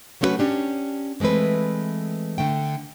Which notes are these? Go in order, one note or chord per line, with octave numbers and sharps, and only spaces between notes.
F#3 A3 C#4 E4 F#4 B4
C#4 D4 G4
E3 G#3 A3 C4 B4
D3 A3 G5